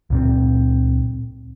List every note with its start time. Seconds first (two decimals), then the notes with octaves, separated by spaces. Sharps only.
0.10 C#2 A#2 C4